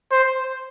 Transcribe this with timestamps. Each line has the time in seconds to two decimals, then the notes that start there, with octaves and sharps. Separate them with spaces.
0.12 C5